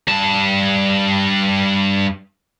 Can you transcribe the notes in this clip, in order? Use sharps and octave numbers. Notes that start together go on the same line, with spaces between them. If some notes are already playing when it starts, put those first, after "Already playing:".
G2 A5